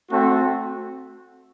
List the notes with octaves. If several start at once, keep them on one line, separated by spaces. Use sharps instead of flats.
A3 C4 F#4